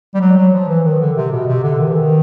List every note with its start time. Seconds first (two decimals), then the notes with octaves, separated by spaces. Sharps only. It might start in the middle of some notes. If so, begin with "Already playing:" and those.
0.14 G3
0.21 F#3
0.37 F#3
0.53 F3
0.69 E3
0.85 D#3
1.00 D3
1.16 C3
1.32 B2
1.47 C3
1.63 D3
1.79 D#3
1.88 E3
1.96 D#3